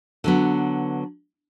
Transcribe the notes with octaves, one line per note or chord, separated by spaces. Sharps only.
D3 F#3 B3